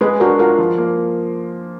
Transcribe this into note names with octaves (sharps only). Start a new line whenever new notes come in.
G#3 G#4 B4
D4 F#4 A#4
F4 F#4 A#4
F3
A#3